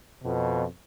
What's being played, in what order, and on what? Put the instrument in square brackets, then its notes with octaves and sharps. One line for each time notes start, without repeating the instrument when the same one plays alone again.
[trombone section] F2 B2